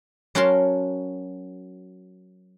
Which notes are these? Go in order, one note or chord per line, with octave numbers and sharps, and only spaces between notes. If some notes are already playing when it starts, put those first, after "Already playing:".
F#3 C#4 F#4 A#4 A5 C6